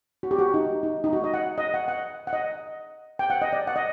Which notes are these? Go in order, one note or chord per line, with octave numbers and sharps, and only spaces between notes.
F#4
G4
F#4
D#4
D#4
D#4
F#4
D#5
F#5
D#5
F#5
F#5
F#5
D#5
G5
F#5
D#5
D5
F#5
D#5